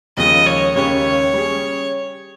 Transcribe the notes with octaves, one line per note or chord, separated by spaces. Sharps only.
D#2 C#3 F3 G#3 D#5
C#5
D#2 C#3 G#3 C#4 G4 C#5
G3 C#4 G#4